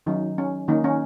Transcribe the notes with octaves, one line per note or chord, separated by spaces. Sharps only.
D#3 F#3 C#4 D#4
C#4
D#3 A#3 C#4 D#4
C#4